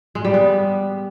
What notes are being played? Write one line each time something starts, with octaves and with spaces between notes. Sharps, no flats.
G#3
G3
B3